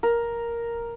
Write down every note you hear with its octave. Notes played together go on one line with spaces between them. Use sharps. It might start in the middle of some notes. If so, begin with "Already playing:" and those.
A#4